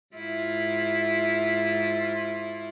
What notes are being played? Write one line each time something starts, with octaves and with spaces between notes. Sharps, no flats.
G#2 E4 F4